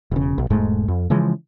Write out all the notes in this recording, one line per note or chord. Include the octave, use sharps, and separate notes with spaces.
E1 C#3
B1
E1 G#2 G#3 A3
F2
C#3 E3 F3 G#3